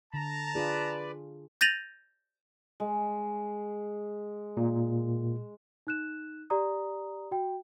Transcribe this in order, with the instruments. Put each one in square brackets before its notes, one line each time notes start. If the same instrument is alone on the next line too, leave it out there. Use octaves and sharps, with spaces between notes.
[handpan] D3 [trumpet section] A5 A#5
[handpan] D4 F4 G#4 [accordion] B4 D5
[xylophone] G6 A6 A#6 D#7 F7 F#7
[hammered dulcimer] G#3
[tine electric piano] A#2
[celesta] D#4 F#6 E7
G4 D5 A#5 D#6
F#4 G5